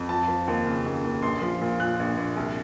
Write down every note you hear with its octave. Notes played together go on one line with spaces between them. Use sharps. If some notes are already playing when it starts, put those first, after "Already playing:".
Already playing: F2
F3 A5
F3
D#2
C#3
D#2
D#2
A#1 C6
F3
A#2
A#2 F#6
A#1
A#1
C2